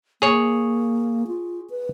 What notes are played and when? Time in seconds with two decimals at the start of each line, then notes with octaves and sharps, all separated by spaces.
0.22 A#3 G#4 C#5
1.27 F4
1.70 B4